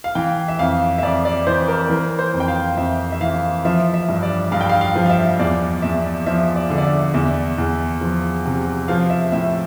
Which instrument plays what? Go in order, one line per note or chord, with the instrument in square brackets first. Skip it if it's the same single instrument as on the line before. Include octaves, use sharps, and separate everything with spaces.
[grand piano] F5
E3 G5
E5
F2 F5
E5
F2 D5
D5
E3 C5
A#4
E3 A#4
C5
F2
G5
F5
F2 E5
E5
E3 F5
F3 E5
E5
G2
D5
G2 F5
G5
F5
F5
F3
F5
E5
E2 D5
E2 E5
F3 E5
D5
D3
D5
E5
E2 E5
E2
F3
C3
F3 F5
E5
A2 E5